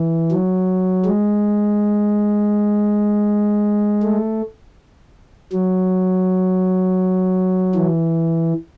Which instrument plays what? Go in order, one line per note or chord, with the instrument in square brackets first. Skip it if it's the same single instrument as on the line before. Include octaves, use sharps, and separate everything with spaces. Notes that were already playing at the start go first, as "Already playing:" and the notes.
Already playing: [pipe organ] E3
F#3
G#3
A3
F#3
E3